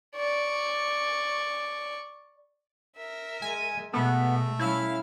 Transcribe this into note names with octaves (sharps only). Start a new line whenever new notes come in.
D5 C#6
A#4 E5
G#3 G#5
B2 G#3 A3 B3
G3 C#4 E4 F5